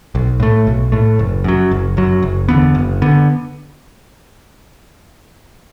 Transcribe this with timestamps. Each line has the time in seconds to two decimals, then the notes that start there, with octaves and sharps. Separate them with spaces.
0.15 B1
0.40 A2 A3
0.67 B1
0.92 A2 A3
1.19 F#1
1.44 F#2 F#3
1.71 F#1
1.97 F#2 F#3
2.22 F#1
2.49 E2 D3 B3
2.75 F#1
3.02 D3 B3